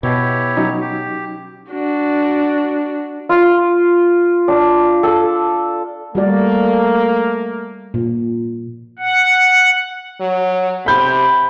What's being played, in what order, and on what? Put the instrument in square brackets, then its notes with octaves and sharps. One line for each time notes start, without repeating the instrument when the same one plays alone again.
[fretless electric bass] B2 [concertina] E4 G4 C#5
[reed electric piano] F#3 C#4 D#4
[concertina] G4
[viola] D4 F#4
[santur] F4
D4
A4
[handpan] G3 F#4 D5 [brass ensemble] A3 A#3
[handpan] A#2
[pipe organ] F#5
[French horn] F#3
[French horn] C3 [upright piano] B5 G6